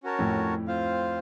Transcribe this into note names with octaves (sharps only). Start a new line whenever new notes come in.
C#4 F#4 A#4 C#5 A5
F2 A2
C4 F4 C5 F5